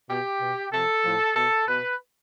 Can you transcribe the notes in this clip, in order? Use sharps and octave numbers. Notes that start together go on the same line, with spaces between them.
B2 G4
B2
C3 F3 A4
A2 F3
B2 A4
B2 B4